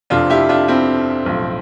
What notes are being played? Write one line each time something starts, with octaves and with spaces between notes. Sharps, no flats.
F1 F2 C3 D4 F4
E4 G4
D4 F4
C4 E4
B1 A2 F3